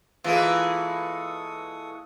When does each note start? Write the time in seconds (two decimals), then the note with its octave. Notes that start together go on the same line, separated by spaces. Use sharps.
0.24 E3 G#3 A#3 F4 A4 C#6 D#6